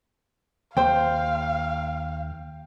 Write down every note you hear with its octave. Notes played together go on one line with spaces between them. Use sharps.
D#2 C5 F5 G5